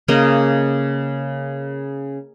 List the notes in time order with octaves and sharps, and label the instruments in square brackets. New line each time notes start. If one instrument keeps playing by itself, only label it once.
[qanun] C#3 A#3 D#5